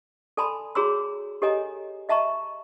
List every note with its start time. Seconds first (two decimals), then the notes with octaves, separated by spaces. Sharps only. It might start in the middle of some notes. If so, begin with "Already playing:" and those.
0.37 A4 D5 G#5 A5 B5 C6
0.75 F#4 G#4 C#5 A#5 C6 E6
1.42 G4 A4 C#5 D#5 G#5 A#5
2.09 D#5 E5 A5 A#5 C#6